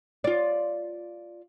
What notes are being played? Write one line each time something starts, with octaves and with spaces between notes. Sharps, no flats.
F4 D5